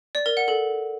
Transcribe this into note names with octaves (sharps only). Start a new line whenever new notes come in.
D5
A#4
F#5
A4